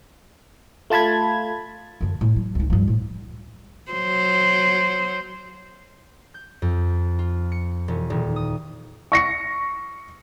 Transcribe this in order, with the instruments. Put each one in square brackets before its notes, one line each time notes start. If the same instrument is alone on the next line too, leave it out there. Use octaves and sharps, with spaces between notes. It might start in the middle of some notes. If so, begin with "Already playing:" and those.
[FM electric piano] A3 F4 A5 B5 G#6
[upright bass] F#2 D3
A2
F#3
C#2 D#4
G2 F3
A2
[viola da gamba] F#3 C5
[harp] G6
F2
F4
C#7
E1
D#1
D#6
[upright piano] C#6 A#6 C#7